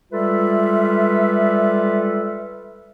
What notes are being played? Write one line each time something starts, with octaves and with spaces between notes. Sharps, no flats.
G3 G#3 F4 A4 B4 E5